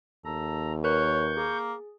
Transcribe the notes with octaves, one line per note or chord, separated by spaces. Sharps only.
D#2 A4 A#5
A#4 B4 C#5 C#6 F#6 G6
A#3 G#4